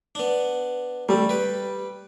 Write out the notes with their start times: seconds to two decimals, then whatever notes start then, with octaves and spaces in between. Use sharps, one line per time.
0.15 B3 D4
1.09 G3 A3 C4
1.29 B4 G5